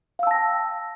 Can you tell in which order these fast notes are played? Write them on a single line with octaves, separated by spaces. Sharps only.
F5 E6 A5 A#6 G5